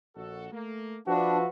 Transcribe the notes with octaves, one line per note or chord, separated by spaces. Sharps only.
A#1 F#4 A4
A3 A#3
F3 D4 F#4 B4 E5